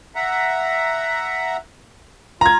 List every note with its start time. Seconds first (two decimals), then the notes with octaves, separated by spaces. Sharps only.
0.15 E5 F#5 A#5
2.41 F4 A#5 G#6